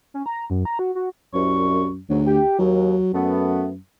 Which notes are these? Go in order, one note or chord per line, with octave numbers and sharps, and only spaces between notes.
C#4
A#5
F#2
A#5
F#4
F#4
C2 F#2 C#6
D2 G#2 F#3
G4
D#2 F#3
F#2 A3 B3